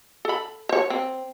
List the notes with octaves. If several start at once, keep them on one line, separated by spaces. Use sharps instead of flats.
A4 B5
C5 C#5
C4